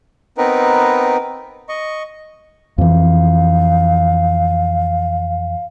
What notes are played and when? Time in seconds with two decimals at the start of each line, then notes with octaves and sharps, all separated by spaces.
0.38 B3 C4 D#4 A#4 B4
1.69 D#5 C#6
2.78 F2 E3 F5